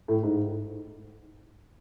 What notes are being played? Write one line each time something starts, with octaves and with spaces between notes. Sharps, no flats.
A2
G#2